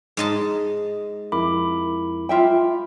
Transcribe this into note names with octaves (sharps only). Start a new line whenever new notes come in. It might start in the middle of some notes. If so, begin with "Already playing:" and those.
G#2 D#5 A5
F2 E4 A#4 B5 D6
F4 E5 G5